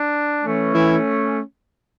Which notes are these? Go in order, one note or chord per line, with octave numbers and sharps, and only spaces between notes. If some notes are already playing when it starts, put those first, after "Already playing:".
Already playing: D4
E3 A3 C#4
E3 E4